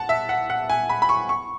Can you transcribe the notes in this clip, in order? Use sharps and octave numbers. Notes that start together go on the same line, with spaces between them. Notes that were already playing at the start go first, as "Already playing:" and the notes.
Already playing: F#5 A5
E5
F#5
F#5
G#5
B5
B5
C#6
C#6